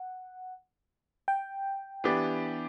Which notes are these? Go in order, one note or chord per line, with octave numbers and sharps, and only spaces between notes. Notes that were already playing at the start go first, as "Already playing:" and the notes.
Already playing: F#5
G5
E3 B3 D4 G4